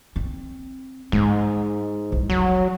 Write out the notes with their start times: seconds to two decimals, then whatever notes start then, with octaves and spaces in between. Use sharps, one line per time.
0.16 C4
1.12 G#2 G#3
2.12 C2
2.29 F1 F#3